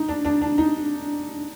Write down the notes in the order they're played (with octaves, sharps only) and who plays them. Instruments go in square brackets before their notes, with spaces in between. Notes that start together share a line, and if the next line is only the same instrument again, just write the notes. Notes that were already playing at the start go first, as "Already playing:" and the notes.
Already playing: [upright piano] D#4
D4
D4
D4
D#4